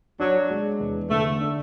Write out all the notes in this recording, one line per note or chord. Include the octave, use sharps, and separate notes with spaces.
F#3 D4
G#3
E2
D3 A3
D4